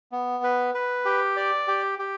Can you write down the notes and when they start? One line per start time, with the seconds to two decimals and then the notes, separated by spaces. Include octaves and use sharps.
0.12 B3
0.44 B4
0.74 B4
1.05 G4
1.37 D5
1.68 G4
1.99 G4